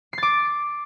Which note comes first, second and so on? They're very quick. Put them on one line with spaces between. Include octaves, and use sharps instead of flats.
C7 A6 D6